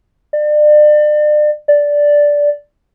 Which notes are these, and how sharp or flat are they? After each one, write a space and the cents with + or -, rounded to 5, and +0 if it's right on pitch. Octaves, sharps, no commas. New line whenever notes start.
D5 +35
D5 -5